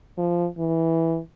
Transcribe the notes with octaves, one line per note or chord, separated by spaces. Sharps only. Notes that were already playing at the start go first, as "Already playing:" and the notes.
F3
E3